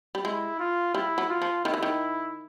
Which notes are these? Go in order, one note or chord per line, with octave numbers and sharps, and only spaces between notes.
G3
G#3 E4
F4
G3 E4
F#3
F4
F3
D#3 E4
E3
D#3